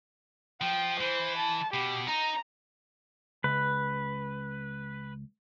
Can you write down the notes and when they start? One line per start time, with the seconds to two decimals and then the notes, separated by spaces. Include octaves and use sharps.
0.61 F3 G5
1.00 E3 C5
1.38 A5
1.74 B2 G4
2.07 D#4 A#5
3.44 C#2 B4